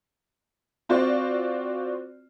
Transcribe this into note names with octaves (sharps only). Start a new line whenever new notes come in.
C4 F4 F#4 C5 D5